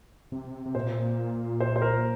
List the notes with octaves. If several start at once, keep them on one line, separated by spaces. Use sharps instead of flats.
C3
C3
A#2 C5
C5
C5
A#4